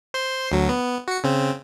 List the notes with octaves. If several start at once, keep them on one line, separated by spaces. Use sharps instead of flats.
C5 C6
D2 F#3
B3
F#4 C#7
C#3 C4